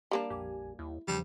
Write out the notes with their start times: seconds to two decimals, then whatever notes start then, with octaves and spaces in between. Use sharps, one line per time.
0.11 G3 A#3 D4
0.30 A#1 F2 G4 G#5
0.79 D#2 E4
1.08 E2 C#3 F3 G3